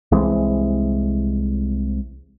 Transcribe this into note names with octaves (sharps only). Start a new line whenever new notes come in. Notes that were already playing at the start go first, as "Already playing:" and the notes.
C2 E3 G#3 C4